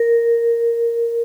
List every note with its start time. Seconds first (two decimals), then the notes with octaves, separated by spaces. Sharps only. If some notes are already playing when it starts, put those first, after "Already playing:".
Already playing: A#4